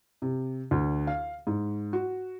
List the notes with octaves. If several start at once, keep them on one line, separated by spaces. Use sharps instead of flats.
C3
D2
F5
G#2
F#4